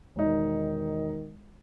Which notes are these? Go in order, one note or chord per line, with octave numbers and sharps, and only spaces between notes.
E1 D#3 D#4